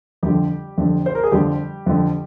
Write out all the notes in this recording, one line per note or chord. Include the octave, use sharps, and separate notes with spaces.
F2 D3 F3 G3 G4
F2 D3 F3
C5
A#4
G#4
F2 D3 F3 G3 G4
F2 D3 F3